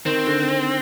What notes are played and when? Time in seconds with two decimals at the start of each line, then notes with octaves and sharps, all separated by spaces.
0.05 D#3 C4
0.27 D3